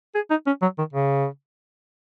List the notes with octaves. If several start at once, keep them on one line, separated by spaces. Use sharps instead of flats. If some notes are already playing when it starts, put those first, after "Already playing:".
G#4
D#4
C#4
F#3
D#3
C#3